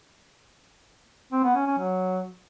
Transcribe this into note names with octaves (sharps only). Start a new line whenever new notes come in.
C4
B3
C#4
C#4
F#3